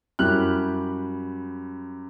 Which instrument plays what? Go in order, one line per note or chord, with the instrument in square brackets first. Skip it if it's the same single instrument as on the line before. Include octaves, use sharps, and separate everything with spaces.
[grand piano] F#2 G3 E4 G4 F6 F#6